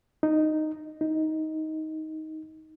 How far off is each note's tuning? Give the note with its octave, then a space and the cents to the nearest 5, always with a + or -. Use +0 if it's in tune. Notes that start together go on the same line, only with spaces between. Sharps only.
D#4 -5
D#4 +15